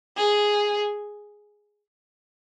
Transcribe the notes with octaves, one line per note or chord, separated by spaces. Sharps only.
G#4